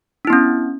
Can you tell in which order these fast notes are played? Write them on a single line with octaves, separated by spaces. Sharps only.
D4 E4 B3 C#4